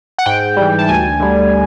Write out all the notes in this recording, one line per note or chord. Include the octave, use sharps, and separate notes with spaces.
F#5
G#2 G5
E3 G3
A5
D2 G#5
D3 G3